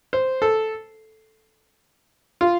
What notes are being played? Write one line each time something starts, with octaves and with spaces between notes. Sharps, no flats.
C5
A4
F4